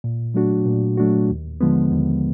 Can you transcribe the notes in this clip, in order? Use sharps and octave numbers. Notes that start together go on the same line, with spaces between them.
A#2
F#3 A3 D4 F#4
A#2
F#3 A3 D4 F#4
D#2
D3 F3 G#3 B3
D#2